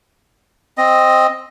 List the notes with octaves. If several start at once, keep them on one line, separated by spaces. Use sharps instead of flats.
C4 D#5